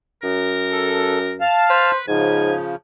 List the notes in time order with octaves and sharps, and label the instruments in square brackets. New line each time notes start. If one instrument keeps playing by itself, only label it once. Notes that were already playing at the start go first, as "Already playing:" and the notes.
[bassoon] F#2 [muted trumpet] A#4
[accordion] A4
F5 A5 F6
[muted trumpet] B4 [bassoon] C5
[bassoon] G#2 [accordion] C#3 F3 [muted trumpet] G#5